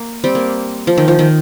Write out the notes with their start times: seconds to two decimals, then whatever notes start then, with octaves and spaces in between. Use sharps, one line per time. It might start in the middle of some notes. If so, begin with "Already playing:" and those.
Already playing: A#3
0.24 G3 C4
0.35 A#3
0.87 F3
0.98 D#3
1.08 F3
1.19 D#3